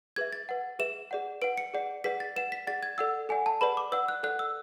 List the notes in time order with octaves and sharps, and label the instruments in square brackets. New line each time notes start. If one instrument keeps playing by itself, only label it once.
[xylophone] G#4 B4 E5 G#6
A6
B4 F#5
G#4 B4 E5 E7
G#4 D5 F#5
B4 F#5 D7
C#7
G#4 D5 F#5
G#4 B4 D5 F#5 B6
A6
B4 F#5 E7
B6
G#4 D5 F#5 A6
G#6
A4 D5 F#5 E6
A4 D5 F#5 G#5
A5
G#4 B4 D5 F#5 B5
D6
B4 D5 F#5 E6
F#6
A4 D5 F#5 F#6
E6